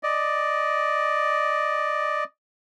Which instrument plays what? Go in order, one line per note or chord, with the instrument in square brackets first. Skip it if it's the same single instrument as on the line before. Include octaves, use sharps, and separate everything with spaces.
[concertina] D5 D#5